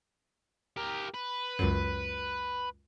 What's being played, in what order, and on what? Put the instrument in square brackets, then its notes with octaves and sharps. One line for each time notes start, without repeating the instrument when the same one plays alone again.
[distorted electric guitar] G4 A#4
B4
[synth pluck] C#2 F#2